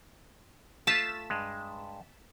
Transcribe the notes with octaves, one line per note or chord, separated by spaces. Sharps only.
A3 F4 A5 A6 B6 E7
G2 G#3